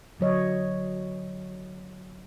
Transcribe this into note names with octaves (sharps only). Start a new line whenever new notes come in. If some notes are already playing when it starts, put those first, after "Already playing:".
D3 F#3 C#5 D#5